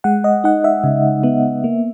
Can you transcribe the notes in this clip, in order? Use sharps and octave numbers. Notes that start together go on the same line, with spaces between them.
G#3 F#5
D#5
D#4 F#5
E5
C#3
B3
A#3